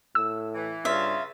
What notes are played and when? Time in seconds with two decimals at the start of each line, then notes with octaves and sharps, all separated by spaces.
0.15 A2 E6
0.54 E3
0.85 G2 C#3 F4 E5